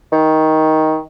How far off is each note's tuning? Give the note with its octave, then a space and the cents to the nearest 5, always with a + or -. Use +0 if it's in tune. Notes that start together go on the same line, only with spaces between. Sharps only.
D#3 +15